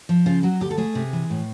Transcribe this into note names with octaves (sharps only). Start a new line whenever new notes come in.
F3
C#3 F4
F#3 F#4
D2 G4
A4
A3 G#4
C3
E3
A2